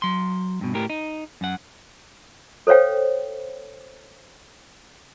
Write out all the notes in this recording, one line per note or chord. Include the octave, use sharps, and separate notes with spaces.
F#3 C6
G2 B2
A2 G4 A#4
D#4
F#2 F#5
A4 C5 C#5 F5 G5